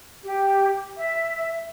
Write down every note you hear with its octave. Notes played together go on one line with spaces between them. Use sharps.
G4
E5